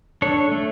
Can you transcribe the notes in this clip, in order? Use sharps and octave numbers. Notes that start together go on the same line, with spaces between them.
D4 A4 C#5
A3